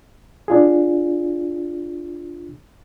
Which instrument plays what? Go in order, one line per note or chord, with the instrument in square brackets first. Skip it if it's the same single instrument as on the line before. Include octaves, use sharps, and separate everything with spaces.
[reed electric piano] D4 F4 G#4